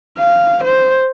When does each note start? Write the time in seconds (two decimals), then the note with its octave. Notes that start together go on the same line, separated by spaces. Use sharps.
0.18 F5
0.64 C5